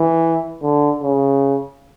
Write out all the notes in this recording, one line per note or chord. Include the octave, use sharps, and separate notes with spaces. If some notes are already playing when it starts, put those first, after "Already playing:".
Already playing: E3
D3
C#3